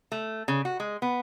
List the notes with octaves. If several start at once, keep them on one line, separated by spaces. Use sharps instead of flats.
A3
C#3
F#4
G#3
B3